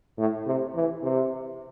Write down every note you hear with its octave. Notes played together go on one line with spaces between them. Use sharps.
A2
C3
E3
C3